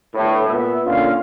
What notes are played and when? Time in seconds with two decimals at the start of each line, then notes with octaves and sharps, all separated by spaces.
0.15 G1 A2
0.49 A#2 B3 E5
0.86 A#2 D3 C#4 F4 F5